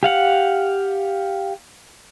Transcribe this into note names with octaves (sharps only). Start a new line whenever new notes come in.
G4 F5 F#5